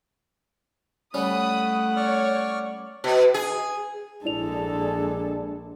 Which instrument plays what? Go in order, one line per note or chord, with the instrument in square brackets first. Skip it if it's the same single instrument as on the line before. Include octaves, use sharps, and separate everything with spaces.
[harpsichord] G3 C#4 [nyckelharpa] A3 F#5 [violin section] B5 D#6
[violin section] C#5 [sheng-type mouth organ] D5 C#6 F6
[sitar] B2
G#4
[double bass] A#1 [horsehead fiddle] G#3 A4 [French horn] D4 [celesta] E4 D5 F7